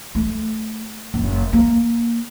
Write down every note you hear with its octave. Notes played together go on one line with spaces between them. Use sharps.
A3
F#1
A#3